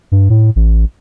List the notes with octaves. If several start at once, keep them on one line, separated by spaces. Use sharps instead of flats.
G2
A2
A1